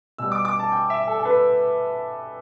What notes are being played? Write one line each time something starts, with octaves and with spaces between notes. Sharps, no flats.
B2 G3 E6
D6
D6
A5
G5
E5
A4
A4
B4